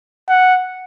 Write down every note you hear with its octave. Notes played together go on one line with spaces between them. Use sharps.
F#5